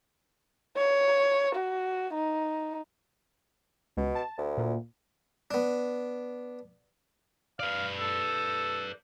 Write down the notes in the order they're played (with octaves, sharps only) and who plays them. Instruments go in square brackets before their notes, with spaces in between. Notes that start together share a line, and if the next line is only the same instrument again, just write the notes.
[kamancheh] C#5
F#4
D#4
[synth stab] C#2 [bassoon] B2
[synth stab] A5
[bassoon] D2
[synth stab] A#2
[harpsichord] B3 D4
[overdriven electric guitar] B4 D5 [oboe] F5
[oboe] A4